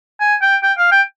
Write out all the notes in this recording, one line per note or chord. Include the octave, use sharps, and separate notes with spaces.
G#5
G5
G5
F5
G5